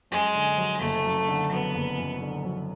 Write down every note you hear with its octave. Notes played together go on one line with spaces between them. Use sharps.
F#2 G#3
D3
F#3
F#1 A3
F#2
D3
F#3 B3
F#1
F#2
D3
F#3